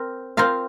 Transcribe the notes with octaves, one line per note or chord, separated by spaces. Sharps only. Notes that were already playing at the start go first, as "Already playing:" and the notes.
Already playing: C4 A#4
C4 F4 A#4 F5